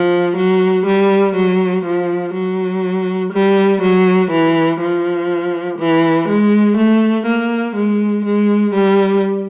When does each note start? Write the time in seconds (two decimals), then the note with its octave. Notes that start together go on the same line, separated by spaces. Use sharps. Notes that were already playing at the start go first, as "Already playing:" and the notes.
Already playing: F3
0.37 F#3
0.86 G3
1.36 F#3
1.85 F3
2.33 F#3
3.33 G3
3.82 F#3
4.32 E3
4.80 F3
5.79 E3
6.28 G#3
6.77 A3
7.26 A#3
7.76 G#3
8.25 G#3
8.74 G3